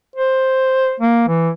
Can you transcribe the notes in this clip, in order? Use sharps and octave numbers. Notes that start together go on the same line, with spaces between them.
C5
A#3
E3